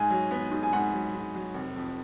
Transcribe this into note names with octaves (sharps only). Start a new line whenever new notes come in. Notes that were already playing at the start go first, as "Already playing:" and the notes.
Already playing: G#2 G#5
F#3
B3
G#2
G#5
G#2 F#5
F#3
G#2
F#3
F1
F2